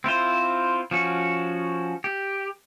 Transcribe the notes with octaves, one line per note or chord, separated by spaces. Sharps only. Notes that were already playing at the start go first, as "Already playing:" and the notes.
C4 E4 F4 C5
F3 C#4 F#4
G4